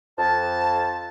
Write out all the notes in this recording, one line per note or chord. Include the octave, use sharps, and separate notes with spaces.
F2 A5